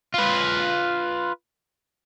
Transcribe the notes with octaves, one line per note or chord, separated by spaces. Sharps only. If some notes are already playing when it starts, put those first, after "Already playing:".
F4 B4